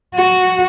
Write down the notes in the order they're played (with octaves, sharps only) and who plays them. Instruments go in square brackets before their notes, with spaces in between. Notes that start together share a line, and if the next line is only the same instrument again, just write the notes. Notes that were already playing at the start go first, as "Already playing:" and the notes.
[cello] F#4